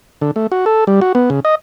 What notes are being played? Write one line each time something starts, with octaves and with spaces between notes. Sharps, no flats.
D3
A3
F#4
A4
G3
F#4
B3
C#3
D#5